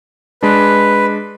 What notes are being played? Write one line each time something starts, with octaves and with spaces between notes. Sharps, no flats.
G#3 D4 B4